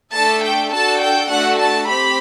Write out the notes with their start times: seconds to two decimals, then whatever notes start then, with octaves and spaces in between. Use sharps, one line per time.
0.13 A3 D4 A4 A5
0.43 G5
0.71 D4 F#4 A4 A5
1.01 G5
1.29 A3 D4 F#4 A4 F#5
1.58 A5
1.88 C4 G4 B5